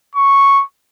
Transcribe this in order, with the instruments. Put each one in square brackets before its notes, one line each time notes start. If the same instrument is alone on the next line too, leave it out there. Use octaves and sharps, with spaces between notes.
[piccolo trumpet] C#6